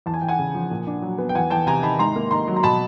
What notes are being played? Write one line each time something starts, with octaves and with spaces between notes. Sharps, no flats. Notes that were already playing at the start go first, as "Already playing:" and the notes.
E2 A5
G#5
E2 G5
F#5 G#5
C#3
F3
A#2
D4
F#3
B3
G5
E2 F#5 G#5
E2 G5 A5
C3 G#5 A#5
D#3 A5 B5
G#2 A#5 C6
A#3
D#3 A#5 C6
F#3
A#5
B2 A5 B5